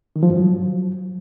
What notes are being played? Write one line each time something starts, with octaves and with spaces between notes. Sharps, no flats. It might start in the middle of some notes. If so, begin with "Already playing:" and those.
D#3
F3
G2
F#3